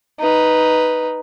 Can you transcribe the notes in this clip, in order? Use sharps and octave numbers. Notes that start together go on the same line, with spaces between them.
D#4 B4